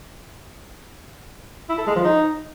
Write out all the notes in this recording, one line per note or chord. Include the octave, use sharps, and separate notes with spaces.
E4
A4
G#3
F3
D#4